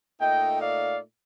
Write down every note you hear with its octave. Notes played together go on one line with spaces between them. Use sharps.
A#2 A3 D#4 D#5 G5
D5 F5